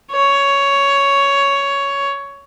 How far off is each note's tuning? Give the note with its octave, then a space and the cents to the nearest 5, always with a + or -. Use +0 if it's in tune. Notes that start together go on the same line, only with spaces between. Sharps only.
C#5 +10